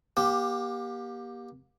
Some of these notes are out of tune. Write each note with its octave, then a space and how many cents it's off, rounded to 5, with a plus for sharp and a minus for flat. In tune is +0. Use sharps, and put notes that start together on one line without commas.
A#3 +35 G4 +5